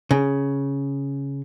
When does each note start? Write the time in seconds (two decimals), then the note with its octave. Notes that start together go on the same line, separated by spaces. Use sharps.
0.11 C#3